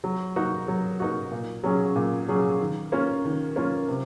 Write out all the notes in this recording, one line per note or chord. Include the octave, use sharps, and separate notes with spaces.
F#3
A#3 D#4 F#4
F#3
A#3 D#4 F#4
A#2
F#3 C#4 G#4
A#2
F#3 C#4 G#4
D#3
A#3 C#4 F4
D#3
A#3 C#4 F4
C3